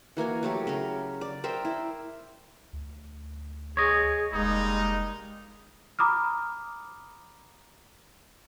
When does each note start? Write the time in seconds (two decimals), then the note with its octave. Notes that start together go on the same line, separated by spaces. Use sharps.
0.17 E3 A#3 F#4 G#5
0.43 F#3 A3 G4
0.67 C#3 A#4
1.21 D5
1.44 A#4 C5 E5 G5
1.65 E4
2.73 D2
3.77 G#4 C#5 D#5
4.33 F1 G3 G#3 A#3 D#4
5.99 A#5 B5 D6 D#6 F6